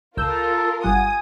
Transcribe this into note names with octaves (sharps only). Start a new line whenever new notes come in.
C#2 F4 A4 A#4 E6 G6
G1 G3 F#5 G#5 D#6